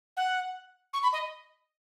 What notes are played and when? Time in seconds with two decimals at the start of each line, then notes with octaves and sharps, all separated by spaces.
0.17 F#5
0.93 C#6
1.03 B5
1.13 D#5